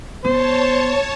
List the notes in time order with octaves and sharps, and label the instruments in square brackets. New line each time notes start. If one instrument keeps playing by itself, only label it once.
[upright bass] B3 [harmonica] C5 [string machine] C#5 A5